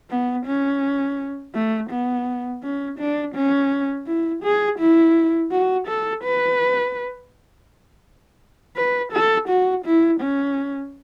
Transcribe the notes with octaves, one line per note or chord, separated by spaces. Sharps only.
B3
C#4
A3
B3
C#4
D4
C#4
E4
G#4
E4
F#4
A4
B4
B4
A4
F#4
E4
C#4